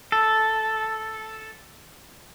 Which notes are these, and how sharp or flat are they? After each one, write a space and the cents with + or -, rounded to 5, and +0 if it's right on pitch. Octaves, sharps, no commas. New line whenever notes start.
A4 -5